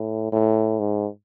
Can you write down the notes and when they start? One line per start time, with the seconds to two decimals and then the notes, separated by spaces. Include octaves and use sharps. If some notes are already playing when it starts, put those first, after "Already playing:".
Already playing: A2
0.32 A2
0.79 G#2